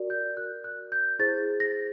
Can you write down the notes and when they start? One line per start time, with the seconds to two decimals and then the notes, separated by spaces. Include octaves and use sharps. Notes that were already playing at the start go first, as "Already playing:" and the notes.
Already playing: F#4 A#4 D5
0.10 G6
0.37 F#4 A#4 D5 F#6
0.64 F#6
0.92 G6
1.19 E4 G#4 C5 A6
1.60 A#6